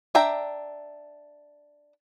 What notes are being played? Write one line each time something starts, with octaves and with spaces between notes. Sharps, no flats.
D4 E5 G5 A#5